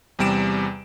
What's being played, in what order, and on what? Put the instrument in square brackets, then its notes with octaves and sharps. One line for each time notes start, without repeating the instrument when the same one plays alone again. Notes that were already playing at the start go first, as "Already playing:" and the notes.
[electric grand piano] E2 C3 G3 D7 E7